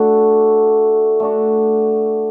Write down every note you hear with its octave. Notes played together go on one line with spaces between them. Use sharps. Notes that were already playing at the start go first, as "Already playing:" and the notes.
Already playing: A3 D4 F#4 A4
A3 D4 F#4